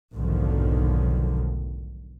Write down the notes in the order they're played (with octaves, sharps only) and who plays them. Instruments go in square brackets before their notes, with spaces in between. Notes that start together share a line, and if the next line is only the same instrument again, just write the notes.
[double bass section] F1 B1 G#2 D3 D#3 F3